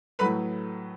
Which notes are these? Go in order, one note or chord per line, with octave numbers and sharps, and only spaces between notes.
A2 F#3 A3 B4 B5